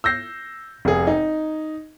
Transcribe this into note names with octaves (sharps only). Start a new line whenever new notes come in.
E6 G6 A#6 C7
F1 G#4
D#4